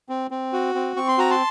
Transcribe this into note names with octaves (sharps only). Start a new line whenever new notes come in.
C4
C4
F#4
C4
C4 C#6
C6
F#4 A#5
A5 C6